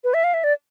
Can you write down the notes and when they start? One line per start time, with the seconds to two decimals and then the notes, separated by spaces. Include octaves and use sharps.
0.04 B4
0.14 E5
0.24 F5
0.34 E5
0.44 D5